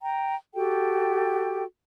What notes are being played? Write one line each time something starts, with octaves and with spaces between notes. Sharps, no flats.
G5 A#5
F#4 G4 A4 G5